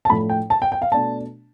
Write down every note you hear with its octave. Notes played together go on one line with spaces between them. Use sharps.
A5
A2 F3 A3 D4 B5
G5
A5
G5
G5
F5
B2 A3 D4 A5